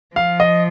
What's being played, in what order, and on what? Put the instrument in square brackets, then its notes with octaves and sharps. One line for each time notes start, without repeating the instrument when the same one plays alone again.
[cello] F3 [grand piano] F5
[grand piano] D#5